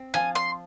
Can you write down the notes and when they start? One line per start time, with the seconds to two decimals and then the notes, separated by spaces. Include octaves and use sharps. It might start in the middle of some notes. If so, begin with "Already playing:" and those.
Already playing: C4
0.14 F3 G#5
0.35 C6